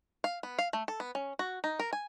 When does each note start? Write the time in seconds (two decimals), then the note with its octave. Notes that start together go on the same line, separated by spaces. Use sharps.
0.24 F5
0.43 B3
0.59 F5
0.73 A3
0.88 A4
1.00 B3
1.15 C#4
1.39 F#4
1.64 D#4
1.79 A#4
1.93 G#5